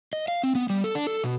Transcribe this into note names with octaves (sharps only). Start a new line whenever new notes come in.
D#5
F5
C4
B3
G3
A4
D4
A4
B2